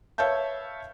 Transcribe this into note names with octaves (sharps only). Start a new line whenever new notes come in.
B4 C#5 E5 F5 A5 G6